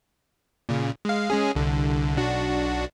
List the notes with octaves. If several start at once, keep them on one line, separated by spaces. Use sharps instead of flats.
A#2 C#3
G#3 F5
G#3 C#4 G#4
C2 D3
B1 D4 F#4